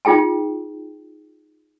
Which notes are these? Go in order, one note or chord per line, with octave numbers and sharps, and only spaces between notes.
D#4 F4 G#4 G5 A5